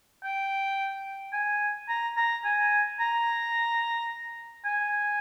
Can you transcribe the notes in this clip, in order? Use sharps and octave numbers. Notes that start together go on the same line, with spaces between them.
G5
G#5
A#5
A#5
G#5
A#5
G#5